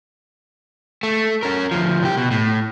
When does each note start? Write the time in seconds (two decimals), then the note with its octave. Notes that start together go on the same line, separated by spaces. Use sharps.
1.03 A3
1.43 C#4 A#4
1.71 D2 F3
2.03 C2 G4
2.17 B2
2.31 A2